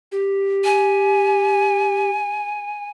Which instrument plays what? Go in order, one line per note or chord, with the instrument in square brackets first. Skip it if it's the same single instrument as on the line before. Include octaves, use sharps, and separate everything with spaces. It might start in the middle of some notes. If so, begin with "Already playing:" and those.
[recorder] G4
[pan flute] G#5